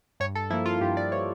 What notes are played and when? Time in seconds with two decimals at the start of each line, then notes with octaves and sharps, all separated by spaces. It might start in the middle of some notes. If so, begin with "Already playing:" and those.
0.20 G2 C#5
0.35 A4
0.50 F3 A#3 E4
0.66 F4
0.81 G2 G4
0.97 D5
1.11 F3 A#3 C#5